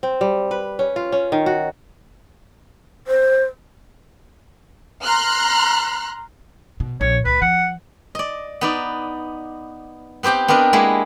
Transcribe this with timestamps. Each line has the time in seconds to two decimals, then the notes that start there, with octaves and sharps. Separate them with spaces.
0.03 C4
0.21 G3
0.51 B4
0.79 C#4
0.96 F4
1.12 C#4
1.32 D#3
1.46 F#4
3.07 C5
5.04 A#5 C6 F6 F#6
6.80 B2
7.01 A#1 C#5
7.25 C#2 B4
7.42 F3 F#5
8.15 D5 D#5
8.61 B3 D#4 D5
10.23 B3 C4 G4 C5 G5
10.48 B3 C4 D4 A#4 D#5
10.73 G#3 A#3 B3 E4